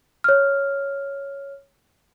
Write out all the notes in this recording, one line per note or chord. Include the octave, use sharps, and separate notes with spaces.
C#5 F6